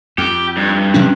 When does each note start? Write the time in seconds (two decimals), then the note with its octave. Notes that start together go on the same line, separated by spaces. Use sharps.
0.18 F2 G4
0.57 G2
0.94 C3 F#3 C#4